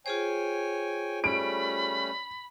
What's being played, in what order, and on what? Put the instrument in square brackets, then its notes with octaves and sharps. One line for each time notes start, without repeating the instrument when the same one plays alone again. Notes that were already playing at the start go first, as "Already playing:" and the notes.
[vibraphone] F4 G#4 C5 [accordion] C#5 G5 G#5
[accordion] G3 A3 C#4 [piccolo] B5 [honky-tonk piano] D7